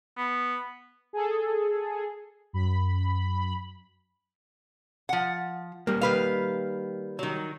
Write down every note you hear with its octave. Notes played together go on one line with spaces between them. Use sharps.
B3
G#4 A4
F#2 B5
F3 F#5
G3 A#3
D#3 B4 F5
D#3 F#3